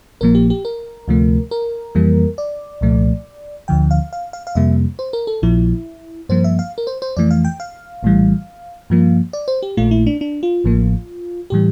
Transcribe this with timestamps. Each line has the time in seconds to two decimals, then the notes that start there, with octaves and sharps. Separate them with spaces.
0.21 A#1 A#2 F3 A#3 A#4
0.35 G4
0.50 G4
0.65 A#4
1.08 D2 C3 F3 A3
1.51 A#4
1.95 F2 E3 G3 A#3
2.38 D5
2.81 C2 A#2 F3 A3
3.68 D2 D3 F3 G5
3.91 F5
4.13 F5
4.33 F5
4.47 F5
4.55 F2 C3 G3 A#3 E5
4.99 C5
5.13 A#4
5.27 A4
5.42 A#1 A#2 F3 E4
6.29 G2 F3 A#3 C5
6.44 E5
6.59 F5
6.78 A#4
6.87 C5
7.02 C5
7.17 F2 E3 A3 D5
7.31 F5
7.45 G5
7.60 F5
8.03 A#1 A2 E3 G3
8.90 G2 F3 A#3
9.33 D5
9.48 C5
9.63 G4
9.77 A#1 A#2 A3 F4
9.91 E4
10.07 D4
10.21 D4
10.43 F4
10.64 A1 A2 F3 A#3
11.50 A2 E3 G3 G4